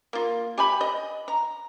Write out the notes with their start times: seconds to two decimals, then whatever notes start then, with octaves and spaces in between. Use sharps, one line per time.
0.13 A#3 F4
0.58 G4 G#5 B5
0.81 D#5
1.28 A#5